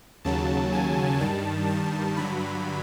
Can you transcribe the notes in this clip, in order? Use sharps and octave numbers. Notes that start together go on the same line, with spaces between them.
D#2 C#3 F#3 A5
G#5
G2 D#3 G3 A5
A5
G2 D3 F#3 B5